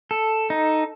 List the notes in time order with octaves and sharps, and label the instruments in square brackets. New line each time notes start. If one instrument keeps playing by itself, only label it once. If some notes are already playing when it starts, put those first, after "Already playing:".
[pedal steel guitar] A4
D#4